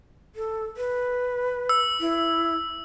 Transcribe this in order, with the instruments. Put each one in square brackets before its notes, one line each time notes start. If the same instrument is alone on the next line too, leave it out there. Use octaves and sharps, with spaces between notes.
[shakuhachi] A4
B4
[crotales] E6
[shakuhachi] E4